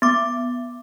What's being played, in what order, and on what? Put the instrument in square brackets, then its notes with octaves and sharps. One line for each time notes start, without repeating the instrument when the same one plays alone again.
[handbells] B3 D6